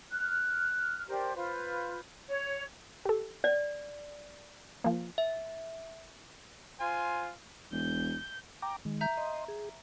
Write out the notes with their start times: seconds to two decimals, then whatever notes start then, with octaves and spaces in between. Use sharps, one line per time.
0.12 F6 F#6
1.08 D4 G4 A#4 C5
1.35 F4 B4 C5
2.28 C#5
3.05 G4 A4
3.44 D5
4.84 F3 A#3
5.18 E5
6.80 F4 C5 G#5
7.72 E1 G6
8.62 G5 A#5 D6
8.85 D#3 G#3
9.01 E5 A#5 G6
9.17 D#5 C6
9.48 G#4